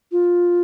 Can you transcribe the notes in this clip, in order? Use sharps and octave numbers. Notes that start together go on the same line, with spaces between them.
F4